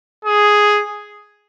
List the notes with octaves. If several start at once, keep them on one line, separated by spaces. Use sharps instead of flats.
G#4